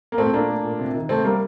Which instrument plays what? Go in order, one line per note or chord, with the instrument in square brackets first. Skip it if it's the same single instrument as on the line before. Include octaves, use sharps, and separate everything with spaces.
[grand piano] A#3
A#2 A3 C4
A3 A#3 D4
A3
A#2
C3
D#3
C3 A3 C4
G3 A#3